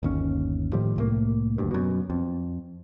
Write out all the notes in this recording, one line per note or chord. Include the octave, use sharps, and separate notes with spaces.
G1 D#2 C#4
A2 D#3 F3 G3
C2 A2 A#3
F#1 D2 G2
F#2 B2
F2